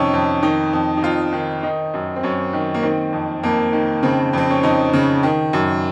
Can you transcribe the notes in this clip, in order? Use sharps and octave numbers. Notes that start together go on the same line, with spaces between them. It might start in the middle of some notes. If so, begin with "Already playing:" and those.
Already playing: F2 C3 D#3 C#4 D#4
F2
D#3 D#4
F2
D#4
F2 F4
D#3
D#3 D#4
F#2
C4
F#2 C#4
D#3
A#3
D#3 C4
F2
F2 A#3
D#3
C#3 C4
F2 C4
C#4
F2 D#4
C#3
D#3
F#2